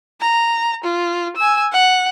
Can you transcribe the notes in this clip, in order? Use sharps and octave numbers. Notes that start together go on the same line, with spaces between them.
A#5
F4
G#5 E6
F#5